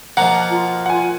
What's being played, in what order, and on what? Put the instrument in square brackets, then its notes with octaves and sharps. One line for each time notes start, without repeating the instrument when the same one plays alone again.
[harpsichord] B2 F3 A#3 [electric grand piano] F#5 A#5
[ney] F4
[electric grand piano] F#5 G#5